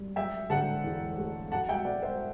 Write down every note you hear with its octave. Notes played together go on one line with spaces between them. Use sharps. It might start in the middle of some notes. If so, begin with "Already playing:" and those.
Already playing: G3
F#3 E5 G5
D3 F#5 A5
E2
A3
F#3 F#5 A5
E5 G5
B2 D5 F#5
C5 E5